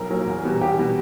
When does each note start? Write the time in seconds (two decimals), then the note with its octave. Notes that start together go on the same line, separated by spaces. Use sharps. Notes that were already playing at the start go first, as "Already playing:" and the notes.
Already playing: B1 A#4
0.10 A#2 F#3
0.26 E2
0.43 B2 G3
0.61 E2 G4
0.78 B2 G3